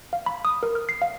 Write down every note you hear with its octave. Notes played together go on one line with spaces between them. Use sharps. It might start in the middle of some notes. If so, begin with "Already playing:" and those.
F5
B5
D#6
A#4
F6
C7
F5